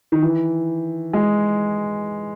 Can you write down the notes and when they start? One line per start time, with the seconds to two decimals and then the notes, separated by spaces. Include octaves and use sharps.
0.12 D#3
0.22 E3
1.13 G#3